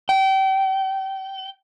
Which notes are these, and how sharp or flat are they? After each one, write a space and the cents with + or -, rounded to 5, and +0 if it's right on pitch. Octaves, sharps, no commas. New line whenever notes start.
G5 -30